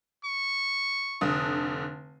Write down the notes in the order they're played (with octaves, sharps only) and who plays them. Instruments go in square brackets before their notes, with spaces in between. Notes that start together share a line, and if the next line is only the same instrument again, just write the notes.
[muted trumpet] C#6
[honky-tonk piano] F1 D3 D#6